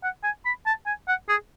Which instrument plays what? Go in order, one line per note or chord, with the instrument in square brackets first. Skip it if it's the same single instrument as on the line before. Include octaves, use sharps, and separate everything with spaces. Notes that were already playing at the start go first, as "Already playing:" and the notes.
[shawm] F#5
G#5
B5
A5
G#5
F#5
G#4